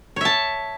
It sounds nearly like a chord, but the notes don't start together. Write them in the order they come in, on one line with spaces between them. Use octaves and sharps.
C#5 E5 A5